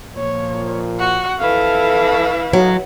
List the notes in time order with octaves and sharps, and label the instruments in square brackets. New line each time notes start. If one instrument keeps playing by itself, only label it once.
[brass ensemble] A#2 F3 [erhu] C#5
[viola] F#4 [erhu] F#5
[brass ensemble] F2 A4 [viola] E3 E4 [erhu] F5
[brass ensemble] A2 D#4 [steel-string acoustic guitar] F#3